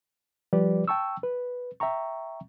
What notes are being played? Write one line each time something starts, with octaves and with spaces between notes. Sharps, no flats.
F3 G3 G4 B4 D5
G5 A5 C#6 E6
B4
E5 G5 A#5 C#6